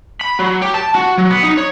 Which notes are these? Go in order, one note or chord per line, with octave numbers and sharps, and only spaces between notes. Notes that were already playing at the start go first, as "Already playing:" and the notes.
B5
F#3
G4
A5
F#4
F#3
B3
D#4
C#5